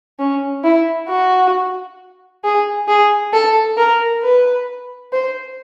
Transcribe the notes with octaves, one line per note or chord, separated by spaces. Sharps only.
C#4
E4
F#4
G#4
G#4
A4
A#4
B4
C5